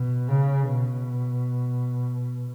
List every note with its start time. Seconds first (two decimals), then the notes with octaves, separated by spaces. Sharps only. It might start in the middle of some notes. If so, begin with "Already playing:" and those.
Already playing: B2
0.28 C#3
0.70 B2